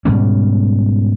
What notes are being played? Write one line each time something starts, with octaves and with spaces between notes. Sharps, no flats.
G#2 B2 G3 C#4